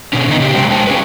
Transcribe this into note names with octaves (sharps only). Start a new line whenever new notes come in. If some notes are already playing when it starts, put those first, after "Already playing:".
B2 D3 C#4
D3 D#3 B3 D#4
C#3 G4
C3 F#3 G#3 C5 G5
F2 F3 G#3 C5 G5 A5
C#4 G#4 B4